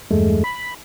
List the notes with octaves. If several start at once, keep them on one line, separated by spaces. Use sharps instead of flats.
E2 G2 G#3 A3
B5